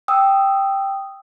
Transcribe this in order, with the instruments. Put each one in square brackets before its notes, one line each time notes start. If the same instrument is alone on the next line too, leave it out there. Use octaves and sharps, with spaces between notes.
[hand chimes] G5 D#6 E6